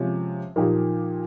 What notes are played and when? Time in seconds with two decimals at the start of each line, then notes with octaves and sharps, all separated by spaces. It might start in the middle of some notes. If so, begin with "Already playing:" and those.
Already playing: C3 F3 G#3 C#4
0.56 A#2 F3 A#3 D#4 G4